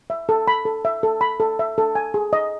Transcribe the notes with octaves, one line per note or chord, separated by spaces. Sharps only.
E5
A4
B5
A4
E5
A4
B5
A4
E5
A4
G#5
G#4
D#5